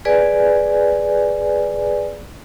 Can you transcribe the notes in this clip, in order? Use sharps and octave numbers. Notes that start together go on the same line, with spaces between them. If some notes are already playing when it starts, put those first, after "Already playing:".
G#4 B4 D5 G#5